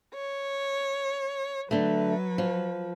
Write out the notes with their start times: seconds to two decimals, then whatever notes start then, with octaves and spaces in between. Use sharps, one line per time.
0.16 C#5
1.71 D3 F#3 A3 B4
2.38 F3